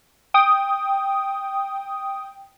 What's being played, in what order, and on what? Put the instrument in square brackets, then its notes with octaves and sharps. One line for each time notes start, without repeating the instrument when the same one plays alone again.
[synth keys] G5 D#6